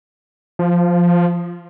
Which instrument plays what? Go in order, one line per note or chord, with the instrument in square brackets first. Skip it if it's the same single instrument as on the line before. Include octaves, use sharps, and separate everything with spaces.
[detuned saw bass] F3